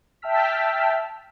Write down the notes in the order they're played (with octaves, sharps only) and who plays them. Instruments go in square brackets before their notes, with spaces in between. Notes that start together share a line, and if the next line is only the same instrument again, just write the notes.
[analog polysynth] E5 G5 A5 E6 F6 B6